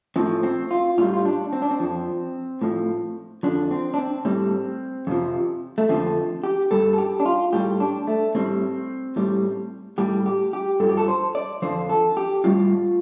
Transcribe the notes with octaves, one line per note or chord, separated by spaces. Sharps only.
A2 F3 C4
C4
F4
A2 G3 F4
F4
D4
C4
D4
C4
F2 F3
A2 F3
F2 D3 F3 D4
C4
D4
C4
A2 G3 C4
F2 C3 F3
A3
F2 D3 F3 C4
G4
G2 G3 A4
A4
G4
D4
F4
A2 G3 G4
D4
A3
A2 G3 C4
A2 G3
A2 G3 G4
G4
G4
G2 F3 A4
G4
A4
C5
D5
F2 D3 F3 C5
A4
G4
A2 G3 F4